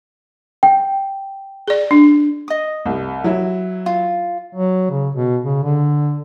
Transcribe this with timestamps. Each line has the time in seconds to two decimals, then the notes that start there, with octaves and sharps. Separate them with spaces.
0.63 G5
1.68 G#4 D5
1.91 D4
2.48 D#5 D#6
2.86 C2
3.24 F#3 E4
3.86 F4
4.53 F#3
4.91 C#3
5.16 B2
5.44 C#3
5.64 D3